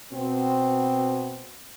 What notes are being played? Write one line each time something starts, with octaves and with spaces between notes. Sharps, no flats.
B2 C4